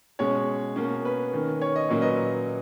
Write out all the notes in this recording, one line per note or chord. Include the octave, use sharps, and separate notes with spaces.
B2 G#3 C#4 C#5
B2 A#3 C#4
B4
D#3 A#3 C#4
C#5
D#5
A#2 F#3 A#3 C#4 C#5
B4 D#5